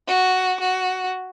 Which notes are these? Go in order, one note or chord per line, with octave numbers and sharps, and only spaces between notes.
F#4
F#4